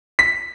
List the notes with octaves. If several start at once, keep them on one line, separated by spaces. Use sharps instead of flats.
B6